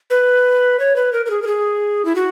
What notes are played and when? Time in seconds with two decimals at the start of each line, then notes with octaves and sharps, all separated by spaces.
0.10 B4
0.79 C#5
0.96 B4
1.13 A#4
1.26 A#4
1.30 G#4
1.42 A#4
1.47 G#4
2.05 E4
2.16 F#4